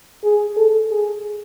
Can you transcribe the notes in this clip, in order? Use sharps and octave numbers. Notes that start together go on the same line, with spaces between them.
G#4
A4
G#4